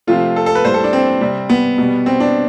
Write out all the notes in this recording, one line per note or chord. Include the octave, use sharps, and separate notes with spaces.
C3 F3 A3 F4
A4
A4
B4
A2 G3 C5
A4
D4
C4
C3 G3
B3
B2 G3
C4
D4